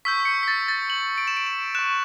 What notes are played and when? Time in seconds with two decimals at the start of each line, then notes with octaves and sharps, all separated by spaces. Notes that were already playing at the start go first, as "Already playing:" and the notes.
0.05 C#6 E6 G6 B6
0.25 C#7
0.43 B6
0.48 A6
0.68 A6
0.90 F#7
1.18 D7
1.27 E7
1.37 D7
1.47 E7
1.75 F#6 E7
1.79 C#6